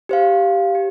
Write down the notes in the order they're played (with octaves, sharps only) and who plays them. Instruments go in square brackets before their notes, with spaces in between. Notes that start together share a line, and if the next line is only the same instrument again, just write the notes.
[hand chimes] G4 C5 F5
G4